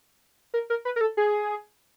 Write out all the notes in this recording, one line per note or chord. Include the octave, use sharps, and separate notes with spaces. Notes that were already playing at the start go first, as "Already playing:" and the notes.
A#4
A#4
B4
A#4
A4
G#4